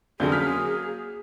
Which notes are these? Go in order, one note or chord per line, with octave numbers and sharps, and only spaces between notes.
F2 D3 F#3 A#3 C#4 G#4 G6
F6 B6